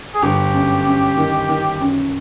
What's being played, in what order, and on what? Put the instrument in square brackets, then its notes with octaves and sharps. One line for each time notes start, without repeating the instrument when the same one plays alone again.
[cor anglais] G#4
[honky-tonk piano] G1 [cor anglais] G4
[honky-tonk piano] F#2
F#2
D#3
D#3
F#2